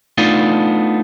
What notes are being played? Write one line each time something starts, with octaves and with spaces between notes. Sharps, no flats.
A3 B3 D4 D#4 F4